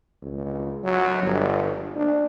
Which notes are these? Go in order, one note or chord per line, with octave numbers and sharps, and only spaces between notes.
C#2
F#3
G1
D4